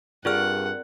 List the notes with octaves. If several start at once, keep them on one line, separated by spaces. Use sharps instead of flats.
G2 C4 F4 G#4 A#4 D5 F#5 F6